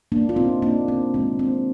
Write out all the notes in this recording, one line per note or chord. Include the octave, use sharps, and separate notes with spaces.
A#3 D4
F4
C4 D#4
A#3 D4
C4
D#3 G#3 C4
C4